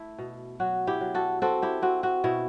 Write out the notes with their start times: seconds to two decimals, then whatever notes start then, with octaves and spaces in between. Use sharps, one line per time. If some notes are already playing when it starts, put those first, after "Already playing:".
Already playing: A3 E4
0.18 B2
0.60 F#3 F#4
0.87 E4 G4
1.01 F#3
1.14 F#4 A4
1.42 C4 F#4 A4
1.62 E4 G4
1.82 C4 F#4
2.03 F#4
2.24 B2 E4